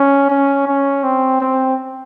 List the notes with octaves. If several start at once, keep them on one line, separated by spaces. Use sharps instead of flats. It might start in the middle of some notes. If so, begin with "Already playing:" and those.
Already playing: C#4
C#4
C#4
C4
C4